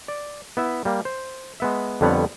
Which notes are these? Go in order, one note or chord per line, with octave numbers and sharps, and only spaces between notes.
D5
B3 E4 E5
G3 A#3
C5
G#3 B3 E5
F2 D3 G3 B3 C#5 F#5